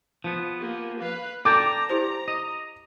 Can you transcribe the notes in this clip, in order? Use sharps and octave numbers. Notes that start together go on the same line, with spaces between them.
F3 B3
A#3 G4
B4 F5
A4 D5 G5 A5 A#5 D6
E4 G4 C5
D#5